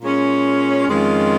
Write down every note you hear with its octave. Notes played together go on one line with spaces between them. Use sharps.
A#2 G#3 C#4
F2 D#3 G#3 C#4 F4